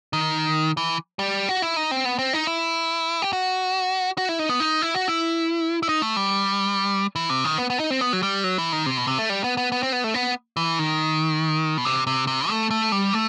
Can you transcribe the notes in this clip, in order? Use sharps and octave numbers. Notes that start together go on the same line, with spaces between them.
D#3
E3
G3
F#4
E4
D#4
C4
B3
C4
D#4
E4
G4
F#4
F#4
E4
D#4
B3
D#4
E4
F#4
E4
E4
D#4
A3
G3
E3
C3
D#3
B3
B3
D#4
C4
B3
F#3
G3
F#3
E3
D#3
C3
B2
C3
A3
G3
B3
B3
B3
C4
B3
A3
B3
E3
D#3
B2
C3
C3
C3
A3
A3
G3
A3